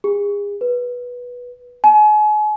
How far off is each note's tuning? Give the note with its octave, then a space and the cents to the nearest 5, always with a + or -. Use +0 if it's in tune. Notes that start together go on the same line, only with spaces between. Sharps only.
G#4 -35
B4 -10
G#5 +40